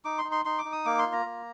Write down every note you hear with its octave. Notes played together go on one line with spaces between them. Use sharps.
D#4 D6
C6
D#4
C6
D#4 C6
D6
D#4
D#6
A#3 D6
C6
F4
A#5
A#3